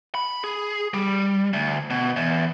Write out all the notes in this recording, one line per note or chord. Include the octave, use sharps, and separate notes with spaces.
B5
G#4
G3
D2
B2
E2